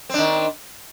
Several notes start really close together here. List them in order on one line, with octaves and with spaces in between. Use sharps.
C4 D4 D#3